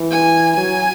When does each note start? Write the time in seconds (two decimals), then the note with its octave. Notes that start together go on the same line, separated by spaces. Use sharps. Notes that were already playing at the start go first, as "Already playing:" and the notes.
Already playing: E3
0.11 G#5
0.57 F#3 G#5